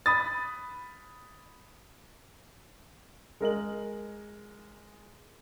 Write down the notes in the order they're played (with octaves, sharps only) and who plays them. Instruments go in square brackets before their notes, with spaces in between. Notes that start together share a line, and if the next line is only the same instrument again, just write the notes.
[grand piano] B5 D#6 A6
G#3 A#4 D#5 F#7